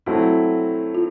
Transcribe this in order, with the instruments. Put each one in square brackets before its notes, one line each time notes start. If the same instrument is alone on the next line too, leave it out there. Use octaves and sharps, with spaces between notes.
[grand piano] F#3 A3 C4 E4 [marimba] F#4
[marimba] F4